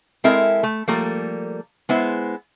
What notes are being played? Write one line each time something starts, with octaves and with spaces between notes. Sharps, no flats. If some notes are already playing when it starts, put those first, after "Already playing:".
G#3 C4 E4 A4 A#4 E5
A3
F3 G3 A3 A#3 A4
G#3 B3 E4 C5